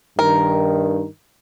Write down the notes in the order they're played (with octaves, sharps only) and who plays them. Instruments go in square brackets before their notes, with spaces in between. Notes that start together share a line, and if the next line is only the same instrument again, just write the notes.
[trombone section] G2 D#3 [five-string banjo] A#4